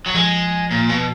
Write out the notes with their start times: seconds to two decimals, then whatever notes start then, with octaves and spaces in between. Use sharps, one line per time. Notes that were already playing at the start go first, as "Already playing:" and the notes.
0.06 F#3
0.14 F3 G#3
0.71 A#2
0.89 B2